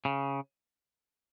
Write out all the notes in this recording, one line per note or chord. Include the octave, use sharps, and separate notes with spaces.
C#3